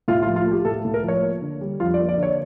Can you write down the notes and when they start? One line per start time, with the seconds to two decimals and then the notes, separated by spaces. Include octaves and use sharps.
0.08 A2 F4
0.23 F4
0.26 F3
0.36 F4
0.46 A3 G4
0.65 A2 A4
0.85 A2
0.94 A#4
1.03 F3
1.08 C#5
1.22 A#3
1.42 D3
1.61 G3
1.80 F2 F4
1.94 D5
1.99 A#3
2.09 D5
2.18 D3
2.23 C#5